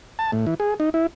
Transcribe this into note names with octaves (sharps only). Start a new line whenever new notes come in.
A5
A2
E3
G#4
D#4
E4